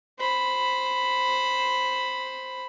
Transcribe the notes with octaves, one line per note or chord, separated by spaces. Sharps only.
C5 B5